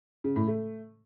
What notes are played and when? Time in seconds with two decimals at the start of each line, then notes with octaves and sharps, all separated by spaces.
0.24 C#3
0.36 A2
0.48 A3